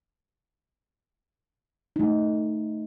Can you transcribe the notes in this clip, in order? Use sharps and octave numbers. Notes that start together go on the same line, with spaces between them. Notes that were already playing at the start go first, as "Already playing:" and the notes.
A3 D#4